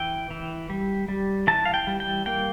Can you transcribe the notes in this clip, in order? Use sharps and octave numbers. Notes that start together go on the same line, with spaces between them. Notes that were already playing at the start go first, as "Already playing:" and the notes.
Already playing: E3 G5
E3
G3
G3
E3 A5
F5
G5
G3
G5
A#3 G5